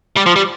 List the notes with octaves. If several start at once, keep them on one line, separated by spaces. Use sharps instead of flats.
G3
F3
G3